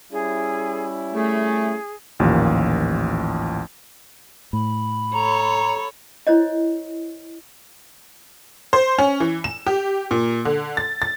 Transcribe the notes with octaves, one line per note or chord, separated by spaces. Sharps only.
G3 C#4 E4 G#4
A3 G#4
A1 D#2 A#2 F3
A2 B5
A4 C#5 A#5
E4 C5 C#5 D#5
C5
C#4
E3
E7
G4
A#2
D3
A6
A6